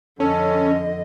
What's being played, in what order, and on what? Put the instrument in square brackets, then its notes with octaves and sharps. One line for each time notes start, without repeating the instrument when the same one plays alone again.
[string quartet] F2 D3 D#5 [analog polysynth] C#4 [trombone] A4